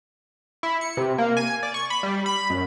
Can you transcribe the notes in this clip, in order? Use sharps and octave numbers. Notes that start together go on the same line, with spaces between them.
E4
C#7
C3
A#3
G#5
D5
C#6
B5
G3
B5
F#2